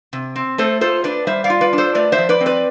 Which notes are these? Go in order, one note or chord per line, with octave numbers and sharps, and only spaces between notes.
C3
C4
A3 A4 C5
F4 A4 C5
D4 B4 D5
G3 C5 E5
D5 F5
F4
B4 D5
D4
A4 C5
A3 B4 D5
C5 E5
F3
B4 D5
C4
B4 D5